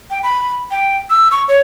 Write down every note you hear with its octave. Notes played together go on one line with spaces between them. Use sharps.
G5
B5
G5
E6
C#6
C#5